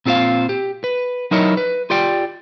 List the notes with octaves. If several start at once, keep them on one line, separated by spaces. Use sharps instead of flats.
A#2 C4 F4 G4 C5 F5
G4
B4
F#3 D#4 E4 A#4 C#5 D#5
B4
F4 G4 D5 G5